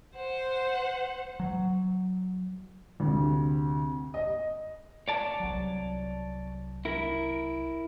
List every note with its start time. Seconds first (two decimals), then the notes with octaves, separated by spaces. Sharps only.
0.15 C5 F#5
1.40 F#3
3.00 D2 C3
4.14 D#5
5.08 C#5 D5 A5
5.40 C2 F#3
6.85 E4 A#4